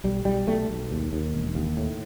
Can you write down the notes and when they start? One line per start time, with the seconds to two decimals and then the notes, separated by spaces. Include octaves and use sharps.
0.04 B1 G3
0.25 B1 G3
0.47 B1 A3
0.69 B1
0.91 D#2
1.13 D#2
1.35 E1
1.55 D#2
1.77 A2